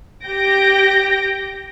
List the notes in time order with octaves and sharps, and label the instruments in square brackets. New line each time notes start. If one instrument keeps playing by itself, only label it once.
[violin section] G4 G6 A#6 D7